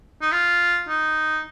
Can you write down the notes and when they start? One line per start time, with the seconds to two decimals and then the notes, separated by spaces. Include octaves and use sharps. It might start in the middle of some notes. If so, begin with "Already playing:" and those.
0.22 D#4
0.32 F4
0.89 D#4